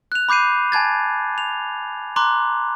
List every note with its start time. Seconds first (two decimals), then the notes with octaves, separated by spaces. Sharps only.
0.12 F#6 F7
0.29 B5 D6 G6 C7 D#7
0.72 G#5 A5 G#6 A6
1.38 F7
2.16 A#5 C6 D6 F#6